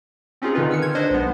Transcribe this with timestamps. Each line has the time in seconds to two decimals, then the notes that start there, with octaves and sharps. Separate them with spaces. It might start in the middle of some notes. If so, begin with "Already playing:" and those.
0.42 C4 C#4 D#4 F4 G#4
0.55 D3 D#3 D#4 F4 B4
0.71 E6 F6 C#7
0.82 G#6
0.95 D4 B4 C5 D#5
1.11 B1 G#3 B3